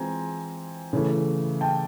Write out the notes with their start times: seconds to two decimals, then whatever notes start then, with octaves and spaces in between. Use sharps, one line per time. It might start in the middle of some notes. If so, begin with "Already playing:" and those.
Already playing: E3 G#3 C4 F4 G#5 A#5
0.93 C#3 E3 A3
1.61 G5 A5